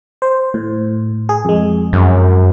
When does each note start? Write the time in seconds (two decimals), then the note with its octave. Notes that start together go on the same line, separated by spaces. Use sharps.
0.22 C5
0.54 A2
1.29 G#4
1.45 F2 G#3
1.93 F#2